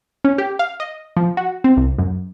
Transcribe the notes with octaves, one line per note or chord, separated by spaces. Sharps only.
C#4
G4
F5
D#5
F3
F#4
C4
C2
F#2